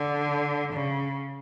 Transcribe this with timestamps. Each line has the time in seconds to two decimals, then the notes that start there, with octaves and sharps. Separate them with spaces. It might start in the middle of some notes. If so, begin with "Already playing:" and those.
Already playing: D3
0.73 C#3